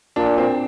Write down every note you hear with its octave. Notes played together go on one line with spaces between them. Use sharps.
A#2 D4
C4